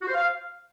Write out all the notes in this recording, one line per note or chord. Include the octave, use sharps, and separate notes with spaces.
F#4
C5
F5